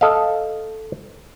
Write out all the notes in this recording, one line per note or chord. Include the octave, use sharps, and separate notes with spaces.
A4 D#5 F5